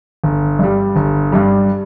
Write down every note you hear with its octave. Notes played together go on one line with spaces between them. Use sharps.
G1
G2 G3
G1
G2 G3